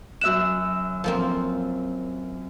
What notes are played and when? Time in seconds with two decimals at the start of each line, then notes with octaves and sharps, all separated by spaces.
0.21 F#2 E5 E6 F#6 E7
1.04 F3 A#3 C4